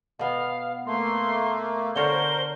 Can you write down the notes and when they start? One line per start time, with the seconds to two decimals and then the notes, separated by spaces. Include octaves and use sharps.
0.19 B2 B3 F5
0.87 A3 A#3 C6
1.96 D3 A#4 C5 C#5 G7